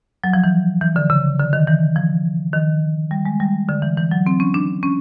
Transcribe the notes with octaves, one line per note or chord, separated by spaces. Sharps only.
F#3
F3
E3
E3
D3
C#3
D3
D#3
E3
F3
D#3
G3
G#3
G3
D3
E3
E3
F#3
C4
C#4
D4
C#4